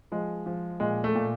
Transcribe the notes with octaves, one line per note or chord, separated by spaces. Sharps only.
F3 G#3
F3
A#2 G#3
A3
A#2